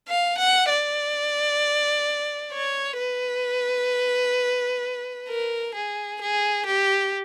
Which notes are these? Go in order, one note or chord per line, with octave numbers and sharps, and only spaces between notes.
F5
F#5
D5
C#5
B4
A#4
G#4
G#4
G4